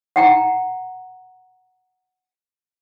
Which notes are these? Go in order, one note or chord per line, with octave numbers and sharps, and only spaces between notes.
F#5 G5 A#5